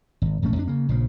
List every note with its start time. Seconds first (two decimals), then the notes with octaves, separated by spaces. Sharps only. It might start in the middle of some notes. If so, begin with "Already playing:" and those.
0.22 G#1
0.42 E1 A#1 A3 C#4
0.56 F2 D4
0.67 C#3 A#3
0.89 A#1 C#3 F3